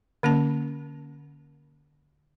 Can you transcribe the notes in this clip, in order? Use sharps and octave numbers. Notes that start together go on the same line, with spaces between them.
D3 A#3 C#4 A5